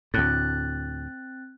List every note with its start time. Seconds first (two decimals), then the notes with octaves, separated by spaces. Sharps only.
0.14 D2 A2 C4 F#6 A6